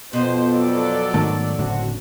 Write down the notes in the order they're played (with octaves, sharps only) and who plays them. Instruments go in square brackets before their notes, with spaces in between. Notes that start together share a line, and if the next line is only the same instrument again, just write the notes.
[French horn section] F2 [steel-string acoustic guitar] B2 [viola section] C5
[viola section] F#3 A4 D5
[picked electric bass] G#2 D#3 A3
[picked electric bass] F#1 A2 D3 [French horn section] C4 F#4